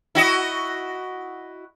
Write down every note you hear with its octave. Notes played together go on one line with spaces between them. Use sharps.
E4 F#4 D#5